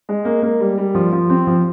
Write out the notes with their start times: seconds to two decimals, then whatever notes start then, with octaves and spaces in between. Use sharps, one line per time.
0.09 G#3
0.25 A#3
0.42 A#3
0.60 G3
0.78 G3
0.95 F3
1.12 F3
1.30 C4
1.47 F3